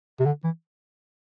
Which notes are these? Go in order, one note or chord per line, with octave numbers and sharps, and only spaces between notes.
C3
D3
E3